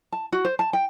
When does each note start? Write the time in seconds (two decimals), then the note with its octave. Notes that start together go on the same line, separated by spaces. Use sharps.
0.12 A5
0.32 F#4
0.45 C5
0.59 A5
0.73 G5